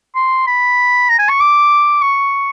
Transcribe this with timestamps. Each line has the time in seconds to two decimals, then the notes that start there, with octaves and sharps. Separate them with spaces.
0.15 C6
0.47 B5
1.10 A#5
1.19 G#5
1.29 C#6
1.41 D6
2.02 C#6